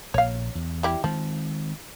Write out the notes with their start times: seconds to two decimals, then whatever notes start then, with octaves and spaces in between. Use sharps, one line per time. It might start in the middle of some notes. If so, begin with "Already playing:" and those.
0.14 A#1 A#2 C#5 F5
0.55 E2
0.83 G3 E4 G4
1.04 D#3 F3 G#3 C4